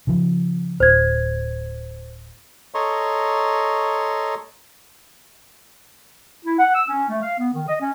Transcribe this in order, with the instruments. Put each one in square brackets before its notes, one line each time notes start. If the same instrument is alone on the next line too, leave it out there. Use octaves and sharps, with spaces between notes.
[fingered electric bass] C#3 F3
[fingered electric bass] D1 [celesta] C5 G#6
[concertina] A4 C#5 D#5 A#5 C6 C#6
[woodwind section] E4
F#5
E6
C#4
A3
F5
B3
D#3
D#5
C#4